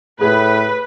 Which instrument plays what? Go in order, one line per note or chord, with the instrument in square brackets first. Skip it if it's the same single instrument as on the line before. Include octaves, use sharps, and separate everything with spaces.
[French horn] A2 [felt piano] G#4 [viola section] B4